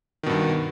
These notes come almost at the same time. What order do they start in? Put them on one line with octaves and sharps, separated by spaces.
D#3 B2 G2